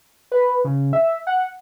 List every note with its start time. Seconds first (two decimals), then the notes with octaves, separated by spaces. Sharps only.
0.32 B4
0.65 C#3
0.93 E5
1.27 F#5